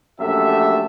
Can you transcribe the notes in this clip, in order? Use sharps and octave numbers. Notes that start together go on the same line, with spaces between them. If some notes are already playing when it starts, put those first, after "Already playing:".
A#1 F#2 A3 G4 A4 E5